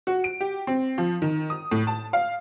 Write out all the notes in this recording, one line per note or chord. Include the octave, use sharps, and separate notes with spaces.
F#4
D7
G4
C4
F3
D#3
D#6
A2
A5
F5